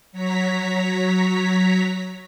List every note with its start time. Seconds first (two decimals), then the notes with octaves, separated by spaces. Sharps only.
0.12 F#3 C#5 A#5 B6